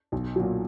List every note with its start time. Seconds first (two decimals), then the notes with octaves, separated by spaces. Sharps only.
0.12 B1
0.36 A#2 F#3